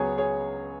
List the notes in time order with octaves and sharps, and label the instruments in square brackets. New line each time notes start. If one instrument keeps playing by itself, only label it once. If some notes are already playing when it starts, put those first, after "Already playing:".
Already playing: [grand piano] C#2 C#3 F#3 B3 G#4 C#5
G#4 C#5